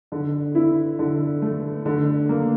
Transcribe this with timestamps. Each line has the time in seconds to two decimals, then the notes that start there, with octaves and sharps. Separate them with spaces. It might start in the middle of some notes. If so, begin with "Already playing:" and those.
0.12 D3
0.55 E4
0.99 D3
1.42 A3
1.86 D3
2.29 A#3